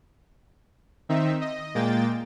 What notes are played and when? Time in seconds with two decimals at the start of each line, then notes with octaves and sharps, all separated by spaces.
1.09 D#3 C4 D#4 E5
1.41 D#5
1.75 A#2 G#3 A#3 G5 A6